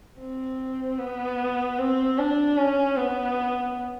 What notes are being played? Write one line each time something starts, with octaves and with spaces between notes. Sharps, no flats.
C4
B3
C4
D4
C#4
B3